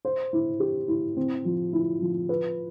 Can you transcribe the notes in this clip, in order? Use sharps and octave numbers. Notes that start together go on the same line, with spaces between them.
C5
E4
G4
E4
C4
F3
E4
F3
B4